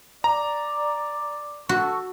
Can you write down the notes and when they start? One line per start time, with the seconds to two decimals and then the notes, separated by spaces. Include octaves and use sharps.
0.24 D5 A#5
1.69 F#4 A4 C#6